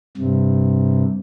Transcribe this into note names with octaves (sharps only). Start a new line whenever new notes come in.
G2 C3